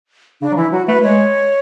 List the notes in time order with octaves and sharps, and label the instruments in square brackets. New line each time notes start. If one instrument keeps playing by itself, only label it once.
[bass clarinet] C#3 [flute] D4
[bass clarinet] F#3
[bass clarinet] E3 [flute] E4
[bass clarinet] F#3 [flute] F#4
[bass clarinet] A3 [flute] B4
[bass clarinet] G#3 [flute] C#5